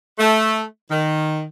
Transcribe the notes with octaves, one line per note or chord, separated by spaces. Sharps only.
A3
D#3